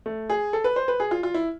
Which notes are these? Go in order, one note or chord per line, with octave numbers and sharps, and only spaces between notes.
A3
G#4
A4
B4
C5
B4
G#4
F4
F4
E4